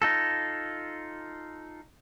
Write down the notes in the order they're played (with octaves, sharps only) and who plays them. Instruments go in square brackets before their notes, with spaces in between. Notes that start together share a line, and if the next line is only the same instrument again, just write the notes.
[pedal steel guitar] D#4 F4 A4